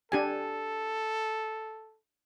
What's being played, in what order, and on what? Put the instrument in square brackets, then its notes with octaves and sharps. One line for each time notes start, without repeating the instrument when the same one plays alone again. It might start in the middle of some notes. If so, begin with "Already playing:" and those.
[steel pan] D4 G4 G#5 [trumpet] A4